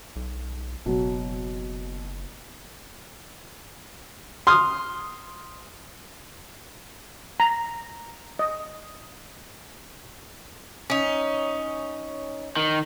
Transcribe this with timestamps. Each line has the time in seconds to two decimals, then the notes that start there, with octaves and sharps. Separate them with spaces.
0.16 B1
0.86 F#1 B2 F#3
4.47 C6 D#6 F6
7.40 A#5
8.39 D#5
10.90 C#4 D#4
12.56 D#3